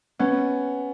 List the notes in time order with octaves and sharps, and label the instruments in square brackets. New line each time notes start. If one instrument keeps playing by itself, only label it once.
[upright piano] B3 [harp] C#4